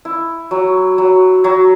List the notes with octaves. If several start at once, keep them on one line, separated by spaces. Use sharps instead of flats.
E4
F#3
F#3
F#3